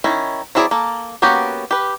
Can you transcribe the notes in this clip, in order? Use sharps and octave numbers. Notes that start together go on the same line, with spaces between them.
D#3 C#4 E4
F#3 C4 E4 G#4 D5
A#3 A4
A#3 B3 C#4 F#4 G4
G4 B4